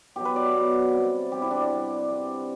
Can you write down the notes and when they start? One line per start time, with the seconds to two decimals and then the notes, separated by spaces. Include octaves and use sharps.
0.16 B2 F#3 G4
0.25 B4
0.36 D5
0.46 E5
0.54 B2 F#3
0.93 C3 G3
1.32 C3 G3 G4
1.42 E4
1.51 D4
1.61 D4
1.70 C3 G3
2.09 C3 G3